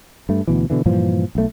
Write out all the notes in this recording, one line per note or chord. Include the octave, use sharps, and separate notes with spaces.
G2 A3
D2 B2 E3
B2 D3 E3
G2 A#2 E3 F3
B1 A3